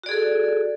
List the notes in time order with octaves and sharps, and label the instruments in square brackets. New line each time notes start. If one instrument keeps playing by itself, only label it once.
[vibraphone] F#4
D5
G#4
A4